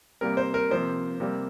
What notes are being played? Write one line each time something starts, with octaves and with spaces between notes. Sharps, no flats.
C3 G3 A#3 A#4
C5
A#4
C3 F3 A#3 C5
C3 G3 A#3